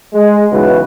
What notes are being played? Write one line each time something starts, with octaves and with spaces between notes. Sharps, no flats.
G#3
B1 G#2 C#3 E3 F#4 B4